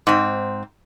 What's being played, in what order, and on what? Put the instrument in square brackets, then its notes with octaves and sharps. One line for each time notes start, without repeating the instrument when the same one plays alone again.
[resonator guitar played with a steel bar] G#2 C4